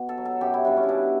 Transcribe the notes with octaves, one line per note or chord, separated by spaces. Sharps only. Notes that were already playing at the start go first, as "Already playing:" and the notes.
Already playing: B2
A4
F#3
A4
F#2 G4
E4
C#3 G3 D4
C#4
E4
B2 D4